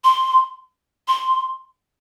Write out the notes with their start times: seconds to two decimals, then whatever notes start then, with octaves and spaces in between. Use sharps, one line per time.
0.04 C6
1.08 C6